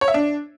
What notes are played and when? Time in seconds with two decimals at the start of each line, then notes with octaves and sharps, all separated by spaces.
0.01 C#5
0.08 E5
0.14 D4